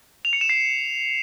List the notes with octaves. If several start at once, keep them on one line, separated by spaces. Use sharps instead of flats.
F7
C#7
E7
C7